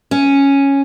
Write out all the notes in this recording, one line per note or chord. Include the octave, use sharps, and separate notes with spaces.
C#4